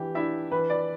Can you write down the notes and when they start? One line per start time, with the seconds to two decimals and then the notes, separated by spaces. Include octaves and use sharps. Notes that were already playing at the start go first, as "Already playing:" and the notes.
Already playing: E3 D4 G4
0.15 D4 E4 E5
0.52 E3 B4
0.70 D5